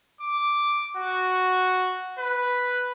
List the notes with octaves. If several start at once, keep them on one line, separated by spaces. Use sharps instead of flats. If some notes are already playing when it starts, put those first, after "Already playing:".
D6
F#4
B4